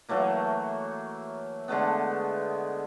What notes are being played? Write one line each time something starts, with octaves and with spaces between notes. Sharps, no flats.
E3 F#3 A3 A#3
D3 G#3 A3 B3